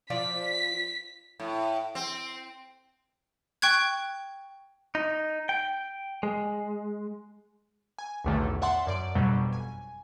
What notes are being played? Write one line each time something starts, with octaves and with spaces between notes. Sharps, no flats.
F3 F4 D5 B6
A2
C4
G5 C#6 F#6 G#6
D#4
G5
G#3
G#5
B1 E2 A2 D3 D#3 A3
D5 E5 F#5 A5 C6
F#2 D5 D7
G1 F2 B2 D3 F#3 G3
G#5